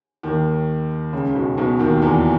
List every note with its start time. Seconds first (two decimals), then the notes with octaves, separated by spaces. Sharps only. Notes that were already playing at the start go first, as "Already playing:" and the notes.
0.23 D#2 D#3
1.13 C#2 C#3
1.35 B1 B2
1.57 B1 B2
1.79 D#2 D#3
2.02 E2 E3